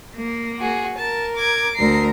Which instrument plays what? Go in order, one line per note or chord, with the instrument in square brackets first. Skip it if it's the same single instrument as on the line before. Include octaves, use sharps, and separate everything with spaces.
[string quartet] A#3
[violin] F#4 G#4
[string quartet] A#4 [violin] A5
[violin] D6 G#6
[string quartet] D2 A#4 A#5 [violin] C7